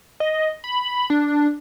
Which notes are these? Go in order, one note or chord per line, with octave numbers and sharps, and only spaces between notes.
D#5
B5
D4